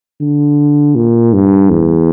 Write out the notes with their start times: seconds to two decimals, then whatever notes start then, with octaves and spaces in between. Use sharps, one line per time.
0.20 D3
0.95 A#2
1.33 G2
1.70 E2